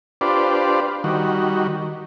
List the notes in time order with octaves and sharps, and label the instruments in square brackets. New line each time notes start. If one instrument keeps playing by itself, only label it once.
[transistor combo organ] D4 F4 G4 B4 C5 D5
D#3 G3 F#4